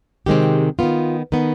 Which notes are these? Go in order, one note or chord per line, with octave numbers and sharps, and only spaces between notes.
C3 D#3 G#3 C4 G4
D#3 B3 F4
D#3 B3 D#4